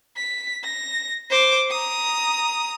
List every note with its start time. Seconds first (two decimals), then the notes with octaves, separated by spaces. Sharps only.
0.17 B6
0.64 A#6
1.31 C5 D6
1.71 A#5 D#6